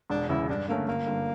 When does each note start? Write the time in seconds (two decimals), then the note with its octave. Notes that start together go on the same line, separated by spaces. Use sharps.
0.10 E1 D4
0.29 E2 C#3 E4
0.49 G2 D4
0.68 D3 A3 A#3 C#4
0.87 G1 A#3
1.07 G2 D3